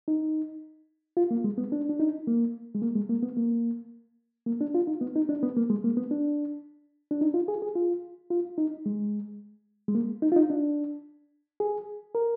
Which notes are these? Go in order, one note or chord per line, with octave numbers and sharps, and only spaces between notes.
D#4
F4
A#3
G#3
B3
D4
D4
D#4
A#3
G#3
A#3
G#3
A#3
B3
A#3
A#3
D4
F4
D#4
B3
D#4
D4
B3
A#3
G#3
A#3
B3
D4
D4
D#4
F4
G#4
G#4
F4
F4
D#4
G#3
G#3
A#3
D#4
F4
D#4
D4
G#4
A#4